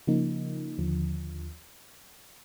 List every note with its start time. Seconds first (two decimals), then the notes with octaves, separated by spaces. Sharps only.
0.07 C#3 F3 A#3 D#4
0.78 D#2 D3 F3